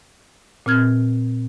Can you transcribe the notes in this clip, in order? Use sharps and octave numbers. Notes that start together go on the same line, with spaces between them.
A#2 C4 F6 G#6